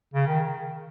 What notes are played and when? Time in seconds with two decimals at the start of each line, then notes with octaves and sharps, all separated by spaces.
0.14 C#3
0.27 D#3